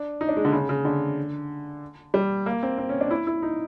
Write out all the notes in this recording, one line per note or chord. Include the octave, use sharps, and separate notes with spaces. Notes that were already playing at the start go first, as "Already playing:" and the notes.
Already playing: D4
D#4
D4
G#3
D3
C#3
C#3
D3
G3
A#3
C4
C4
C#4
D4
E4
E4
D#4